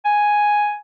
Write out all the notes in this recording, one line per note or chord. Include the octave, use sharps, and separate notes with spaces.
G#5